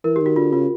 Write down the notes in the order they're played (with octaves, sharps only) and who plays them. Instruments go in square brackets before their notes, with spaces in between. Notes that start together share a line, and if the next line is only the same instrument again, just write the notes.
[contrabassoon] E3 [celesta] A#4
[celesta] G4
[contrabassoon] D#3
[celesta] F#4
[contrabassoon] D3 [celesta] F4
[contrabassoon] C#3 [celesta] F4